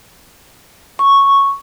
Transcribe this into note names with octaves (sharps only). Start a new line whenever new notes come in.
C#6